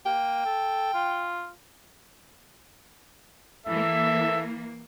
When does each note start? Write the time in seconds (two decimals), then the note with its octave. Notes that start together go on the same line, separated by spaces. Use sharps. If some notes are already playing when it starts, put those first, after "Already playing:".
0.06 A#3 G5
0.45 A4
0.94 F4
3.66 E3 A#3 A4 E5